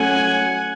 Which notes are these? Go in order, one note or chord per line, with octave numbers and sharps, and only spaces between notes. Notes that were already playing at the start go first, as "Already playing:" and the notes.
Already playing: F#3 A3 C#4 F#5 G#5